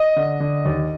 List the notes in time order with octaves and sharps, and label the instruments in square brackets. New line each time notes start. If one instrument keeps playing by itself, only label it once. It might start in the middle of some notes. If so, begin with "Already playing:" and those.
Already playing: [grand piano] D#5
D3
D3
D#2